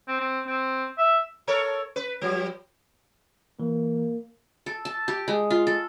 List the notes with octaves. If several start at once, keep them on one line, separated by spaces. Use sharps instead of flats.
C4
C4
C4
E5
A4 A#4 C#5
B4
F3 G3
E3 A#3
A4
A5
G4
G#3
F4
A4